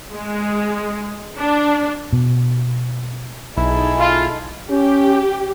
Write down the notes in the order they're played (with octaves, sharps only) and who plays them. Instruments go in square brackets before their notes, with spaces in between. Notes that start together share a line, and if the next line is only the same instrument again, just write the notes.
[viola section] G#3
D4
[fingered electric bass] B2
[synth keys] B1 [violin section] D#4 G#4 A4 [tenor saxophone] E4
[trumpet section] F4
[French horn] C#4 [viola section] G4